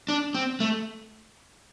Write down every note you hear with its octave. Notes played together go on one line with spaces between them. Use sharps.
D4
C4
A3